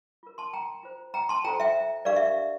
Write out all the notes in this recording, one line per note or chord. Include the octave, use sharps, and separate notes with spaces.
F4 A#4
A5 C6
G5 A#5
F4 C5
G5 A#5
A5 C6
F4 A4 C5 G5 A#5
E5 G5
D4 G4 A#4 D5 F5
E5